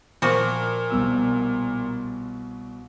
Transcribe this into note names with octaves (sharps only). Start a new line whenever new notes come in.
A#2 F3 F#4
C2 B2 E6